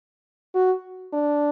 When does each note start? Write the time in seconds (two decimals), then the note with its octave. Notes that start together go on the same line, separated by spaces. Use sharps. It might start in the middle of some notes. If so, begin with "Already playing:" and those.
0.55 F#4
1.13 D4